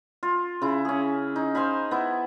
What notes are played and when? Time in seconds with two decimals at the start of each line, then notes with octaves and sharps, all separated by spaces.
0.23 F4
0.62 C#3 E4
0.85 C#4 G#4
1.36 D#4
1.55 C5 F5 G#5 B5
1.91 B3 E4